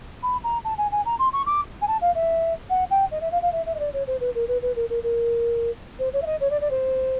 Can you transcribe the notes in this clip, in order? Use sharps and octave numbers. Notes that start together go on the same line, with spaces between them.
B5
A#5
A5
G#5
G#5
A#5
C6
C#6
D6
G#5
A5
F5
E5
F#5
G5
D#5
E5
F5
F5
E5
E5
D#5
D5
C#5
C5
B4
A#4
B4
B4
A#4
A#4
A#4
C5
C#5
E5
D#5
C#5
D5
D5
C5